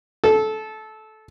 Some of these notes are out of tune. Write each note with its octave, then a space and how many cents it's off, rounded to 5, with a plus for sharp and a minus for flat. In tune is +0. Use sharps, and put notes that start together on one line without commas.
A4 -20